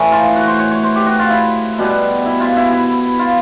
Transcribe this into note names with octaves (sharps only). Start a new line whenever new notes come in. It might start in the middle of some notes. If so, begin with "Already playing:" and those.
Already playing: A2 E3 A3
F4
F#4
C5
C#5
C#5
C5
G4
F#4
F4
E4
B2 G3 B3
E4
F4
E4
E4
F4